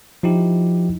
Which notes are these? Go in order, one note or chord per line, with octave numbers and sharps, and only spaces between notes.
F3 D#4 E4 G4